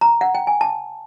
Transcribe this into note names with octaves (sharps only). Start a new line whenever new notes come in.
A#5
F#5
G5
G#5
A5